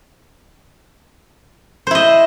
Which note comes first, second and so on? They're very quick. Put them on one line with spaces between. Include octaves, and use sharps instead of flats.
C5 E4 D#5